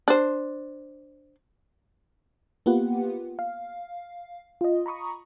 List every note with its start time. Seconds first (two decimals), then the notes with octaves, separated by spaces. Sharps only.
0.08 D4 C5
2.66 A#3 B3 F4 G4 B4 F#5
3.39 F5
4.61 F4 D#5
4.86 A#5 B5 C#6 D#6